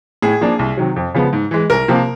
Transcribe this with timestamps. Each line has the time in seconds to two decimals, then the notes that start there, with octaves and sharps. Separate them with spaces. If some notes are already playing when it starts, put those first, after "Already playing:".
0.22 A2 G#4
0.41 F3 A#3 D4
0.59 C2
0.77 C3 D#3 F#3
0.96 F2
1.14 C#3 F3 G#3 B3
1.33 G#2
1.51 E3 G#3
1.70 C2 A#4
1.88 C3 F3 A#3